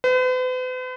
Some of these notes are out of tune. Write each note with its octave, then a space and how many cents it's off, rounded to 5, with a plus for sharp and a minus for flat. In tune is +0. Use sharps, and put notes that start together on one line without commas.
B4 +45